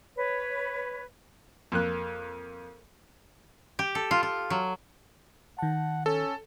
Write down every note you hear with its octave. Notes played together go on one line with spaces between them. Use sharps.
B4 C#5
F2 A#3 F#6
G4
A4
F4
F4
F#3
D#3 F#5 A5
C#4 A4